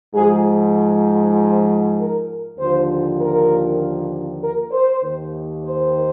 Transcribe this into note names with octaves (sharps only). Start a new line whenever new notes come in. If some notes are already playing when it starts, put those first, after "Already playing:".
G#2 F3 G#4
C5
A#4
D#2 D3 F3 C5
A#4
A#4
C5
D#2 D#3
C5